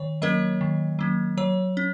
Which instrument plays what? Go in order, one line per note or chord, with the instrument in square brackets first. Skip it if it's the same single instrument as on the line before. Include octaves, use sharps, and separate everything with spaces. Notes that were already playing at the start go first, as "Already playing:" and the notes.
Already playing: [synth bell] D#3 C#5
F#3 A#3 C#4 A#4 D#5
D#3
F#3 A#3 C#4
F#3 C#5
C#4